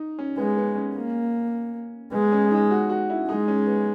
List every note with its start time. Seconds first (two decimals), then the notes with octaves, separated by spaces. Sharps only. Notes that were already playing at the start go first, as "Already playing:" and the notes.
Already playing: D#4
0.19 C#4
0.38 G#3 B3
0.57 B3
0.76 C#4
0.96 A#3
2.12 G#3 B3
2.32 C#4
2.51 D#4
2.71 F#4
2.90 F#4
3.10 E4
3.28 G#3 D#4
3.48 C#4
3.67 B3